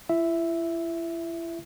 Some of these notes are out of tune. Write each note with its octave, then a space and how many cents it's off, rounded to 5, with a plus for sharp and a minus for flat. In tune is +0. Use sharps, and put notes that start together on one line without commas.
E4 +35 E5 +0